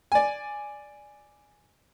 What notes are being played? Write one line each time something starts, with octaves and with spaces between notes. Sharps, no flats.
D5 G#5